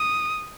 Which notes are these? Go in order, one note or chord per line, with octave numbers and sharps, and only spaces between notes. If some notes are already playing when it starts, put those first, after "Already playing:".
Already playing: D#6